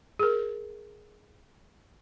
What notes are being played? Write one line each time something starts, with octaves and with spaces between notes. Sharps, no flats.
G#4 A#4